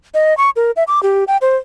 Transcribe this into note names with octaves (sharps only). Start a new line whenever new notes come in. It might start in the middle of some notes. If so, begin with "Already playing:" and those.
D#5
C#6
A#4
E5
D6
G4
G5
C5